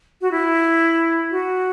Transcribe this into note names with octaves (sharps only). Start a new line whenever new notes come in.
F#4
E4
F#4